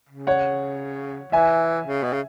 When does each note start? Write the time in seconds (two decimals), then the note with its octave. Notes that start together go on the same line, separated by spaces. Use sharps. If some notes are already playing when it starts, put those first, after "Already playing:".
0.09 C#3
0.27 C#5 F#5
1.32 E3 E5 G#5
1.86 C#3
2.04 B2
2.13 C#3